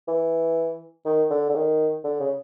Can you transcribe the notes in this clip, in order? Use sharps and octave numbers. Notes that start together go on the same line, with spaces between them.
E3
D#3
D3
D3
D#3
D3
C#3